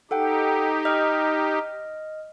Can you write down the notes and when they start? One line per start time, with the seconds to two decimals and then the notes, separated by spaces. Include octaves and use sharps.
0.11 D#4 G4 A4 F#5 G5
0.85 D#5 F6